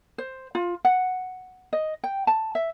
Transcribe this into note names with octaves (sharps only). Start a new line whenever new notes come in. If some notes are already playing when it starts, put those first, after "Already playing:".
C5
F4
F#5
D#5
G5
A5
E5